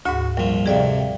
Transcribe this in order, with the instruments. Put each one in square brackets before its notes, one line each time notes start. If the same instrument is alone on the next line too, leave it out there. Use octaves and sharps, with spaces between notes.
[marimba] D2 G#2 [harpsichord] F#4
[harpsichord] A#1 F3 [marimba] G3
[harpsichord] F2 C3 [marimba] G#4 D5 F5